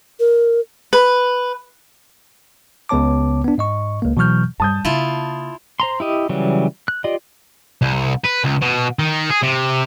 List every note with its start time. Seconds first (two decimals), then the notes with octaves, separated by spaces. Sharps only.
0.20 A#4
0.93 B4
2.89 C#2 C#3 B3 C#5 A5 D6
3.44 B3 D4
3.58 G#2 D#5 C#6
4.02 C#2 A#3
4.17 B2 E3 F#3 C#6 F6 G6
4.60 G2 G3 A5 D#6 G6
4.85 C#3 A#3 E4 F4
5.80 C5 A#5 C6
6.00 E4 G4 D#5
6.29 C#3 E3 F#3 G3
6.88 F#6
7.04 F4 G4 D5 D#5
7.82 C2
8.24 B4
8.44 C#2
8.61 B2
8.99 D#3
9.30 G#4
9.43 C3